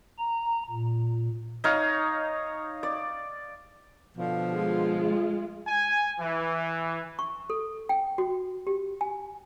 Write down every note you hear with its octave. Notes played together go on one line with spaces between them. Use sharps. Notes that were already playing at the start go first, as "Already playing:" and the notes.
A#5
A#2
D#4 C#5 F5
D5
B2 D3 F3
G#3 F4
G#5
E3
C#6
A4
G5
F#4
G4
G#5